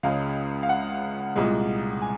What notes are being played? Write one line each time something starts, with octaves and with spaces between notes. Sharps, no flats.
C#2 C#3 G#3 F5
F5
F#5
C2 A#2 G#3
G#5